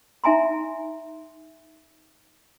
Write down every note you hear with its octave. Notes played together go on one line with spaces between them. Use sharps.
D#4 E5 G#5 A#5 C6